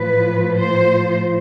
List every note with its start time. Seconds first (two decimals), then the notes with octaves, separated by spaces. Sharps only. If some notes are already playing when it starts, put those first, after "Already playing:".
Already playing: A2 F3 B4
0.55 C5